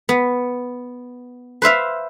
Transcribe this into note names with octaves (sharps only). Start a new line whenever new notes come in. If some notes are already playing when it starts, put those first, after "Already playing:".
B3
B4 C5 E5 F5